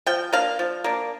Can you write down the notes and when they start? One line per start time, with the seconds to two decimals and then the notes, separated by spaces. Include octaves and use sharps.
0.06 F3 G5
0.33 A#3 D4 F5
0.59 F3
0.84 A#3 D4